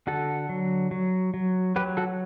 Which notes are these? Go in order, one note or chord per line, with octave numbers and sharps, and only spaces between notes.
D3 F#4 A4
F#3
F#3
F#3
F#3 G4 B4
F#4 A4